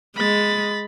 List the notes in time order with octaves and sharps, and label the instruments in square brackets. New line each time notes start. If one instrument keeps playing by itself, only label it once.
[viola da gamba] G#3 [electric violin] B5 A6